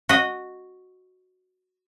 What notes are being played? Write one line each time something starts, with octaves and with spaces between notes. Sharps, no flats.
F#4 D#5